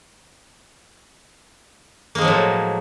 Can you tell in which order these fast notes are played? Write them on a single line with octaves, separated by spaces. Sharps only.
A#3 G#3 F3 F#3 A2